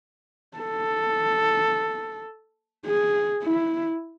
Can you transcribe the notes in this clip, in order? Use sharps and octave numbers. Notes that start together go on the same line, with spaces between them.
A4
G#4
E4